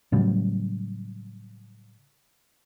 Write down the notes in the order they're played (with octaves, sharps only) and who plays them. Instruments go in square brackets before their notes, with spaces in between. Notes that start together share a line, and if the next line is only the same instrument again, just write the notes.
[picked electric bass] A2 C#3 F#3 G3